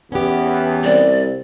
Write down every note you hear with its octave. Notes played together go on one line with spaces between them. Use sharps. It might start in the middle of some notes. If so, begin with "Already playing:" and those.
E2 B3 C#4 G4
C2 D5